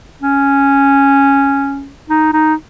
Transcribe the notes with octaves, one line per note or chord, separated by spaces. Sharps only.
C#4
D#4
D#4